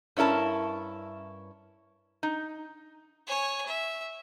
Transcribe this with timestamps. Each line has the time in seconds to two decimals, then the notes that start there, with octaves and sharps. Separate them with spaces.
0.17 G2 C#4 E4 A#4 A5
2.23 D#4
3.27 C#5 G#5
3.66 E5